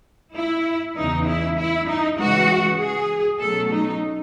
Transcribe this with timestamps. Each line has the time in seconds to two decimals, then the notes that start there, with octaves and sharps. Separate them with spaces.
0.34 E4
0.95 E2 C#3 E3 D#4
1.26 E4
1.58 E4
1.87 D#4
2.18 C#3 E3 G#3 F#4
2.79 G#4
3.40 B2 F#3 A3 C#4 A4
3.71 D#4